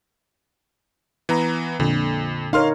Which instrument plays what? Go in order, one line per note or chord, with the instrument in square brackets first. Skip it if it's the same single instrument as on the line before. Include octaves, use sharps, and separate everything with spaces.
[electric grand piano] E3 B3 A#5
[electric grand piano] F2 [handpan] A#2 D3
[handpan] D#4 A#4 C#5 [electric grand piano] F5 C6 F6